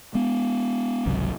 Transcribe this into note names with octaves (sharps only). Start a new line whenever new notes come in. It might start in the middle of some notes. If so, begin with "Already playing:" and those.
G#3 B3
G#1 C#2 C3 F#3